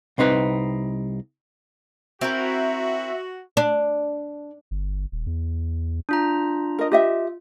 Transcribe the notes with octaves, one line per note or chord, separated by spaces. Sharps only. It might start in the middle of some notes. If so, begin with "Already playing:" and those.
C2 C4 D#4 B4
C4 E4 F#4 A#4 E5
D4
G1
D#1
E2
D4 F4 A#5
A#4 D#5
F4 G4 D#5 E5